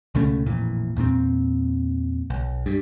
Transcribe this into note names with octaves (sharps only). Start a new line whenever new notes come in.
C#2 B2 A3 C#4
A1 F2 A#2 E3
E2 A#2 B3 C4
B1
G2